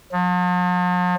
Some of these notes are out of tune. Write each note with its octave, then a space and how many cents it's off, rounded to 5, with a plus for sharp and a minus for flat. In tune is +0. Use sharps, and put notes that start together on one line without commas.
F3 +45